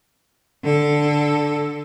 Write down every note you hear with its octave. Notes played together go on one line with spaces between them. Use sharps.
D3 A4